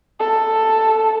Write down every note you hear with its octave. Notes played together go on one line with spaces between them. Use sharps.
A4